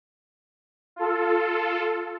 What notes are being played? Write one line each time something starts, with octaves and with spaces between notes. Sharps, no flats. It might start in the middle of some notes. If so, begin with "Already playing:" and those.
F4 A4